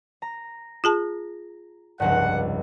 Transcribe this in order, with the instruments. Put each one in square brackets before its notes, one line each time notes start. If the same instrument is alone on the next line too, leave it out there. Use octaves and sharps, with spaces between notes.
[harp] A#5
[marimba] F4 G#4 A5
[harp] F1 C#2 G2 [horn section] F#5